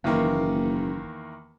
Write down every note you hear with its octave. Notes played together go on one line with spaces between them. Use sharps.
F#1 E2 D#3 A#3